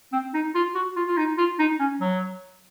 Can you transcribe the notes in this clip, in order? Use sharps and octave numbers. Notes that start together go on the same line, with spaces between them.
C4
D#4
F4
F#4
F4
F4
D#4
F4
D#4
C#4
F#3